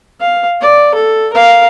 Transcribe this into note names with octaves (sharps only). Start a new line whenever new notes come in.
F5
D5
A4
A#4 F5